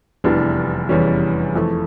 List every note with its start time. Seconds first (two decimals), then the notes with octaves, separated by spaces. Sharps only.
0.24 F1 E2 E3 G3 D4
0.89 F1 E2 E3 G3 C#4
1.56 F2 E3 A3